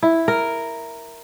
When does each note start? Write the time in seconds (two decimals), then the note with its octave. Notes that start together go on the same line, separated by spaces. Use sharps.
0.03 E4
0.28 A#4